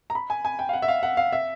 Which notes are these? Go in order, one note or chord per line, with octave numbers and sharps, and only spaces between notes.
A#5
B5
G#5
G#5
G5
F5
F#5
E5
F5
F#5
F5
E5